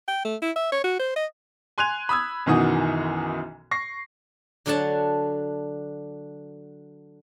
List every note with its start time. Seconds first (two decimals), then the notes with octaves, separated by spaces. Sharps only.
0.08 G5
0.25 A3
0.42 E4
0.56 E5
0.72 C#5
0.84 F#4
1.00 C5
1.16 D#5
1.78 G#5 C6 F#6 G#6 D#7 F7
2.09 B5 D#6 E6 G#6
2.46 B1 F#2 D#3 E3 F#4 D#6
3.71 C#6 A#6 C7
4.66 D3 F#3 D4 F#5 A5